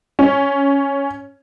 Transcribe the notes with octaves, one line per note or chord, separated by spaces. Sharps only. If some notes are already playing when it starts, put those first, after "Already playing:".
C#4